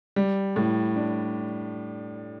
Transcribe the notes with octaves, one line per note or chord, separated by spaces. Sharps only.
G3
A2
D4